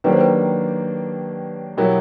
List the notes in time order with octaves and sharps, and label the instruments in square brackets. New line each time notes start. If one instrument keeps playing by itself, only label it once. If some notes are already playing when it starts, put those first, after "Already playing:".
[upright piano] D#3 F#3 A#3 D4 G4 [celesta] B4
[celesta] C5
B4
[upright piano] B2 F#3 B3 E4 G4 [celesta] A#4